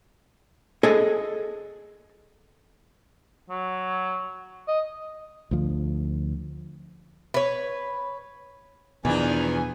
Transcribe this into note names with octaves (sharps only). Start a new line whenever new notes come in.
G#4 A4 D#5 G#5
F#3
D#5
D2 F3
B4 C#5
E2 B2 D#3 F3 D4 B4 G#5